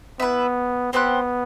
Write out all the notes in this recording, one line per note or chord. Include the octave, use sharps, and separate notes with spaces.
B3 E4 B4 E5
B3 C4 G4 C5 F#5